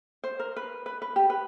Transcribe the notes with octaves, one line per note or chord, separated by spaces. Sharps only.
C5
A#4
B4
B4
B4
G4
B4